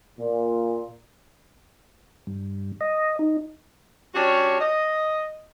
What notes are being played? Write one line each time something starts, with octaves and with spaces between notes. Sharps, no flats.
A#2
G2
D#5
D#4
G3 C#4 D4 F#4 G4 C#5
D#5